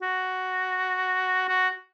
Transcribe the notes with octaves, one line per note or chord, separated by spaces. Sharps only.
F#4
F#4